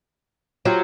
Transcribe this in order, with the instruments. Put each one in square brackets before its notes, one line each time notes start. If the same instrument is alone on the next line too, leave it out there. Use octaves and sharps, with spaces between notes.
[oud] F#3 [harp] F4 G4